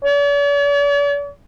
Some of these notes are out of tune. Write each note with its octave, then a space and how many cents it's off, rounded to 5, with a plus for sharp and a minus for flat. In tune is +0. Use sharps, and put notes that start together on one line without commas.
D5 -45